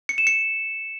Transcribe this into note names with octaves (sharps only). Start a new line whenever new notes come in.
C#7
E7
C#7